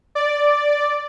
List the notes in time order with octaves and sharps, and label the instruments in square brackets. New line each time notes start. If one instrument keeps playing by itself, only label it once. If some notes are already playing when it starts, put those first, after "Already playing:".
[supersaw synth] D5